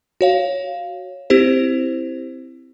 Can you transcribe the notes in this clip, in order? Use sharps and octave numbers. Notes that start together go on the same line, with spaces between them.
F#4 C#5 F5
C4 E4 G4 C5